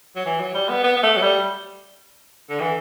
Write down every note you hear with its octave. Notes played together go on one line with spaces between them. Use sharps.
F#3
E3
F#3
G3
B3
B3
B3
A3
F#3
G3
D3
E3